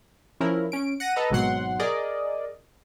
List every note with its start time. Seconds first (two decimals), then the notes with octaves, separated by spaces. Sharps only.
0.40 F3 C#4 E4 A#4
0.72 C#4 D7
1.00 F#5 A#6 D#7
1.16 A4 B4 D#5 A#5
1.30 G#1 G#2 B2 F#3 F#5 C6
1.80 G#4 A#4 D5 D#5